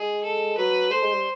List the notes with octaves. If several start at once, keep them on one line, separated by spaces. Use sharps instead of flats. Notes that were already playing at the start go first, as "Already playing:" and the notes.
Already playing: G#3 G#4
A4
F#3 B4
A3 C5
G#3
G3